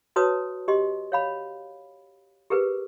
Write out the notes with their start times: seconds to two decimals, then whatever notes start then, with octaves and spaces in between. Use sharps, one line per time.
0.16 F#4 B4 C#5 A5 D#6
0.68 G4 D#5 C6
1.12 C#5 F5 B5
2.50 G4 G#4 A#4 B4